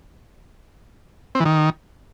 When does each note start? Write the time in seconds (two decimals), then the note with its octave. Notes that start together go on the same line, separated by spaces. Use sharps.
1.35 C4
1.40 E3
1.45 D#3